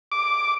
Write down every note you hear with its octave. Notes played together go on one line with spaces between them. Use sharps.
D6